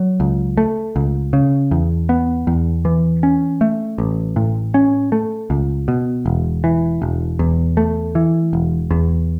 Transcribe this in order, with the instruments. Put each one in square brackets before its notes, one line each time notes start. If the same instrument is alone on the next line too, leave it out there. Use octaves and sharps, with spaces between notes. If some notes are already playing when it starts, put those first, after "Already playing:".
Already playing: [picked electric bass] F#3
C#2
A3
C#2
C#3
E2
B3
E2
E3
C#4
A3
A1
A2
C#4
A3
C#2
B2
E1
E3
E1
E2
A3
E3
E1
E2